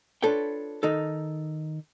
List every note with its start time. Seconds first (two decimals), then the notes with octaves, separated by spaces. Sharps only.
0.22 D4 F4 A4 B4 C#5 G5
0.83 D#3 D#4 A4